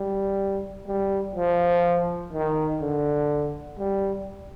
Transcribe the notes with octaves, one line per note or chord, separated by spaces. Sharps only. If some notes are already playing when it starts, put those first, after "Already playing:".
Already playing: G3
G3
F3
D#3
D3
G3